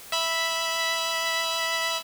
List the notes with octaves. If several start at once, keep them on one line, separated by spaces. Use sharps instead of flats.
E5 B5